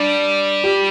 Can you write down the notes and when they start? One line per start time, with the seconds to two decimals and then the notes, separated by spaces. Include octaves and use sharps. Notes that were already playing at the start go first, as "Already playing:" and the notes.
Already playing: G3 D4
0.64 G4